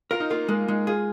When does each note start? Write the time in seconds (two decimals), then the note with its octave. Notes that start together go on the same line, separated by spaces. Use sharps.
0.11 F4 A#4
0.20 D#4
0.30 A#3 F4
0.49 G#3 A#3
0.68 G#3 D#4
0.87 F4 G#4